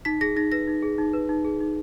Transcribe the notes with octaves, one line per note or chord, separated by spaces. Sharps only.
D#4 B6
G#4 A#6
D#4 A#6
B4 A#6
D#4
G#4
D#4
B4
D#4
G#4
D#4